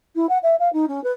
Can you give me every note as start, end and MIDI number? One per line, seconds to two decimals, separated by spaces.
0.15 0.26 64
0.29 0.38 78
0.42 0.55 76
0.59 0.71 77
0.73 0.85 63
0.87 1.02 61
1.03 1.11 71